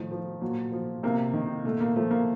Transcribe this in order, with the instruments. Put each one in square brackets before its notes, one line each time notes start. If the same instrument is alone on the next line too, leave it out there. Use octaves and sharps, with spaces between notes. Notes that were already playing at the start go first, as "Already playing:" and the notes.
Already playing: [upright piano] A2 D#3 F3
F3
A#2 F#3
F3
C3 A#3
D#3
A#2 A3
A#3
F3 A3
A#3